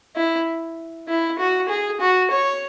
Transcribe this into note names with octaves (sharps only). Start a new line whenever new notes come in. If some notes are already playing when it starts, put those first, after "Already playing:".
E4
E4
F#4
G#4
F#4
C#5